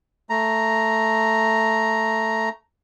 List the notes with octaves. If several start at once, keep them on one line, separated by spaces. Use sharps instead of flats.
A3 A#5